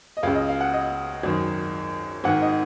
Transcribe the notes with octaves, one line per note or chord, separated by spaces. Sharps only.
D#5
C#2 C#3 F5
D#5
F5
F#5
D#5
G#1 F#2 D#3
G#1 G#2 D#3 F#5
D#5